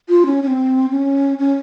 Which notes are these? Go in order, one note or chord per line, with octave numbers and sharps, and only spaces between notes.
F4
C#4
C#4
C4
C#4
C#4